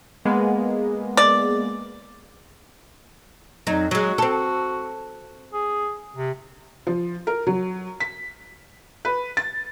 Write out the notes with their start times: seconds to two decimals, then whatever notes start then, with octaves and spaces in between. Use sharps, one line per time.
0.25 G#3 A#3 B3
1.17 D5
3.67 F2 F#3 D#4
3.91 F#3 G#3 F#4
4.18 C4 A4
5.53 G#4
6.17 C3
6.87 F3
7.27 A#4
7.47 F#3
8.00 B6
9.05 B4
9.37 A6